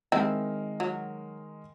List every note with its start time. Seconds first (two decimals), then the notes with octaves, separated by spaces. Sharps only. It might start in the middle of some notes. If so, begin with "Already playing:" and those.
0.12 D#3 G#3 C4 E4 A#4
0.80 F#3